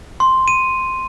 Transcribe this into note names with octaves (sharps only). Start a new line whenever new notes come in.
C6
D#7